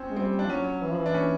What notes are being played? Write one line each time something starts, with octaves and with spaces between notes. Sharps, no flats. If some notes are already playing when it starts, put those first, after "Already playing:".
Already playing: C4 C#4
G#3
G3 C4
D4
F3
F#3 C#4
E3
F3
E3
D4
C#4